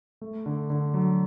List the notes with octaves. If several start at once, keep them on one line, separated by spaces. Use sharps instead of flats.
A3
D3
D3
F#3